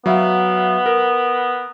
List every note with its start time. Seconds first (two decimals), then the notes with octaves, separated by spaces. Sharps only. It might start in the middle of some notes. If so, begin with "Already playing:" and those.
0.06 F#3 B3 E5 F5
0.86 A#4